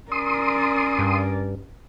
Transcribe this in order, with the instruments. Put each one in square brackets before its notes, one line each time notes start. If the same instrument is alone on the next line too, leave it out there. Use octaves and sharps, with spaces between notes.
[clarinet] C#4 [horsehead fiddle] A#4 D5 [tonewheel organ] C6 D#6
[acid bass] G2